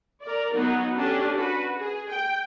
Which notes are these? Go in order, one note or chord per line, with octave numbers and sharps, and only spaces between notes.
A#4 D5
F#3 B3 D#4
C#4 D4 G4 A4
F#4 B4
G#4
G5